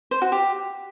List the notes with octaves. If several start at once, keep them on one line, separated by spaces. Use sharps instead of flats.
C5
F#4
G4